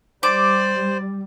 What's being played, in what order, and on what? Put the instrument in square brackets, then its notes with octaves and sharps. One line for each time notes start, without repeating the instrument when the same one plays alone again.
[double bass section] G3 [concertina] C5 [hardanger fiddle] D5 [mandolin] D6